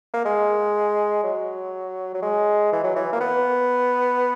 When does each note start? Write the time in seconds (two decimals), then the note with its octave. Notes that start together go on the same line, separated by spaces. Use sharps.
0.14 A#3
0.25 G#3
1.23 F#3
2.14 F#3
2.22 G#3
2.72 E3
2.83 F#3
2.96 E3
3.13 A#3
3.20 B3